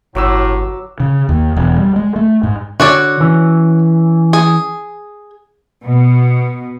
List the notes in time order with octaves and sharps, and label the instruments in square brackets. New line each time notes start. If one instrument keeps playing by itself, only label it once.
[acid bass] G1 [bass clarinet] A2 [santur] F#3 D6 E6
[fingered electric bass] C#3
D#2
E1
G3
G#3
A3
G#2
[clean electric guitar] D3 [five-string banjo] F#4 C#5 D5
[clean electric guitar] E3 C#4
[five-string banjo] G#4
[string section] B2